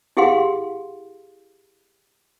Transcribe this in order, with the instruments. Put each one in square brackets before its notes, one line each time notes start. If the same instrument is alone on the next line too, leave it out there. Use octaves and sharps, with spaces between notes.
[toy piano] E4 G4 G#4 F5 F#5 C6